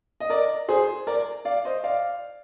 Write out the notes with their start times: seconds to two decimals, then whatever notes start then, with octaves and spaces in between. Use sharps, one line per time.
0.20 D#5
0.30 A#4 D5
0.68 G#4 C5
1.07 A#4 D5
1.45 D5 F5
1.65 C5 D#5
1.84 D5 F5